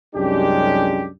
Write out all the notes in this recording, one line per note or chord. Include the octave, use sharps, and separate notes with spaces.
C2 F#2 G#3 C#4 D4 G4